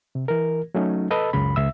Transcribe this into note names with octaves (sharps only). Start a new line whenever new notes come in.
C3
E3 A#4
F#3 A3 C#4 D#4
A4 B4 D#5 A5 B5 E6
C#2 F#2 C#3 B5
C#2 E5 E6